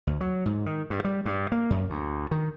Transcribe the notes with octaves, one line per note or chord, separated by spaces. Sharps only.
D2
F#3
G#2
D#3
G2
G3
G2
A#3
F#2
D2
D#3